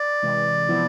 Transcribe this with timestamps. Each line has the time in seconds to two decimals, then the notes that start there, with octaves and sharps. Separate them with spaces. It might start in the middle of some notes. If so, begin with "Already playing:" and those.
Already playing: D5
0.23 C3 E3 G#3
0.69 C3 F3 B3 E4